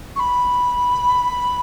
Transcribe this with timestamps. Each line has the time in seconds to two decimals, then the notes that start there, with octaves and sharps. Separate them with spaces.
0.15 C#6
0.19 B5